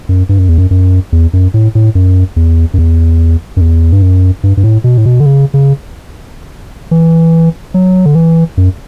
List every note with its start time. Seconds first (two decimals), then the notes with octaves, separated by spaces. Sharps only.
0.09 F#2
0.29 G2
0.39 F#2
0.49 E2
0.58 F#2
0.71 F#2
1.12 E2
1.33 F#2
1.54 A2
1.75 A2
1.95 F#2
2.36 E2
2.74 F#2
2.78 E2
3.57 F#2
3.61 E2
3.93 G2
4.02 F#2
4.44 G2
4.57 G2
4.64 A2
4.84 B2
4.98 A2
5.06 B2
5.20 D3
5.26 C#3
5.54 C#3
6.91 E3
7.74 F#3
8.06 D3
8.15 E3
8.57 F#2